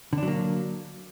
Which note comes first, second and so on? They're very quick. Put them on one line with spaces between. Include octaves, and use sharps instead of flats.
D3 D4 F#3 A#3